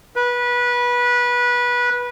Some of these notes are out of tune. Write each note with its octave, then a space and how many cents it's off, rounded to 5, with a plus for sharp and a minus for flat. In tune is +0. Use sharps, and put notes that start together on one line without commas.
B4 -20